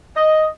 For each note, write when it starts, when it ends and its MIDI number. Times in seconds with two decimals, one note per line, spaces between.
0.14 0.46 75